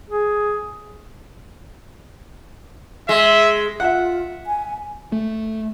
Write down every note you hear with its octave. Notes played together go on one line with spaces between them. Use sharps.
G#4
G#3 E5
F4 E5 F#5
G#5
A3